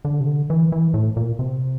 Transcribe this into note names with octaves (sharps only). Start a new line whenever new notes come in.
D3
C3
D3
E3
E3
A2
A#2
C3